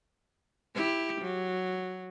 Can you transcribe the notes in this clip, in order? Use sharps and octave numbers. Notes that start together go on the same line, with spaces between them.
E4 G4
F#3